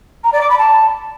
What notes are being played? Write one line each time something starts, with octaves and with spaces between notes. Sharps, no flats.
A#5
D5
D6
B5
A5